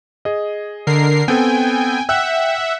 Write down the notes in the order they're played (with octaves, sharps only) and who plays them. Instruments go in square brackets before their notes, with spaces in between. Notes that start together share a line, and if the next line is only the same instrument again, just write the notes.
[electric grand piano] G#4 D#5
[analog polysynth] D3 A#4 C7
[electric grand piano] B3 C4 A4 [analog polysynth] G5 G#5
[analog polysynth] E5 F#5 [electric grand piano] G5 E6 F#6